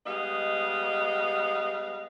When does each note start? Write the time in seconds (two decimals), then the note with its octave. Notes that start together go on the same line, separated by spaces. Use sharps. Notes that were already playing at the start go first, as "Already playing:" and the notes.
0.06 G3 G#3 B3 D#5 F5